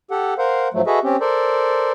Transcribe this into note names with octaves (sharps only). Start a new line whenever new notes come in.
G4 A4 F#5
A#4 C5 F5 F#5
G#2 F3 F#3 A3
F#4 G#4 A4 B4 D#5 E5
C4 C#4 G4
A4 A#4 C5 D5